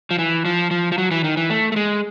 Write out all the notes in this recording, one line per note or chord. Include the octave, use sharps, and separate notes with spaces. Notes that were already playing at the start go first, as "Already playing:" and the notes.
F3
E3
F3
F3
F3
F#3
E3
D#3
E3
A3
A3
G#3